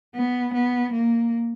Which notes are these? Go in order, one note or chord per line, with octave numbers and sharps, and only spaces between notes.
B3
B3
A#3